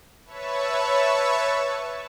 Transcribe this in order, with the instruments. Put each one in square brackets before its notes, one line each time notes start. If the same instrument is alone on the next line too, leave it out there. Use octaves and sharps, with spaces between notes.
[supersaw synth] B4 C#5 E5 A5 C#6